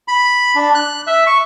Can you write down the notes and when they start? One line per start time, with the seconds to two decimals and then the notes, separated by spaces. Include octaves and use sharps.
0.08 B5
0.55 D4
0.75 F#6
1.07 E5
1.27 C#6